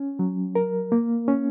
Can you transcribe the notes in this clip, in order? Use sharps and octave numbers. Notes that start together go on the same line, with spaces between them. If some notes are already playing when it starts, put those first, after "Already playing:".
Already playing: C#4
F#3
A#4
A#3
C#4